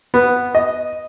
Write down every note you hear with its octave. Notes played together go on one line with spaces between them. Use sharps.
B3
D#5